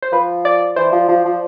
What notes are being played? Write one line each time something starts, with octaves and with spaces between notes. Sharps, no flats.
C5
F3 B4
D5
E3 C5
F3
F3
F3